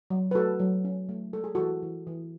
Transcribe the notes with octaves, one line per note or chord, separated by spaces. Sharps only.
F#3
B4
A3 F#4 A4
F#3
C#4
A3
G#3 A4
G#4
E3 F#4 A4
E3
E3